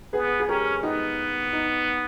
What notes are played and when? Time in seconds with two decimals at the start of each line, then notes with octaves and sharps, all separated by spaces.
0.13 B3 G#4 B4
0.40 G#4
0.48 C#4 G4 A#4
0.83 B3 D#4 G4
1.53 D#4